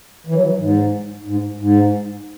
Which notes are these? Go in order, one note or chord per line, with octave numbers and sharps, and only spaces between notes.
E3
F#3
E3
G#2
G#2
G#2